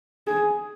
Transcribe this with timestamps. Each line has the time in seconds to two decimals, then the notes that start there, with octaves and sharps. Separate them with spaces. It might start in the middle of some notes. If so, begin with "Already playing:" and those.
0.27 G#4